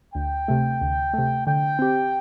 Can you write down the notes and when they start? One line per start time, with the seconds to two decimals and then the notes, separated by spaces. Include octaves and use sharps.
0.15 D2 G5
0.48 C3 A3
0.81 D2
1.13 C3 A3
1.46 D3 G5
1.79 C4 G4